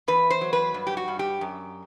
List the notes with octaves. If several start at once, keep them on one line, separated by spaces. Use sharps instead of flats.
E2 B4
C5
F#3
B4
G2
G4
F#4
G2
G4
F#2